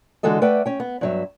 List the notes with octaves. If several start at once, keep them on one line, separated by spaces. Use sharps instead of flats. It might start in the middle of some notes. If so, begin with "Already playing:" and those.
D3 E3 G#3 F#4 A4 D#5
A3 B4 D5 E5 F#5 G5
C#4 G5
B3
G2 F#3 E5